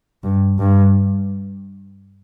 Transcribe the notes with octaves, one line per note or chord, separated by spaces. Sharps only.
G2
G2